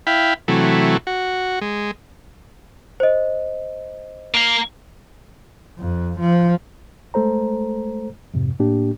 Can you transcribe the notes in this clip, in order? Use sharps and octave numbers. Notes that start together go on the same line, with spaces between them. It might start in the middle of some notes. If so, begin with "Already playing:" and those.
E4 F5 G5 B5
C3 E3 F#3 A3
F#4
G#3
C5 D#5
A#3 F5
F2
F3
G#3 A3 A4 C5 A#5
F2 G#2 C3
A2 A#3 D4 G4